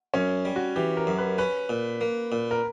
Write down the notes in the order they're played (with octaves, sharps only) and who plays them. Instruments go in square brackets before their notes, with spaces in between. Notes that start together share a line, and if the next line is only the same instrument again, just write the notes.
[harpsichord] F#2 [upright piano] C#4
[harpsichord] G3
[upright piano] F#4
[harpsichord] E3 [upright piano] G4
[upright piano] A#4
[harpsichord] F#2
[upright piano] B4
[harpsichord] C#4 [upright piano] B4
[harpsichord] A#2
A#3
A#2
[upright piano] A#4